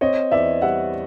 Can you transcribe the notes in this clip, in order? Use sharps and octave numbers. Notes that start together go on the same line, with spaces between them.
C4 C#5 D#5
E2 D5 E5
G3 E5 F#5